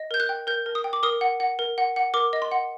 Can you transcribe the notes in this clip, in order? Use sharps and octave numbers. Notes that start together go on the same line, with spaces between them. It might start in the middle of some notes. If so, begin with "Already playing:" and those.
Already playing: D#5
A#4 G6
F#6
G5
A#4 G6
A#4
D#6
G5
D6
A#4 D#6
F#5
F#5
A#4
F#5
F#5
A#4 D6
D#5
C6
F#5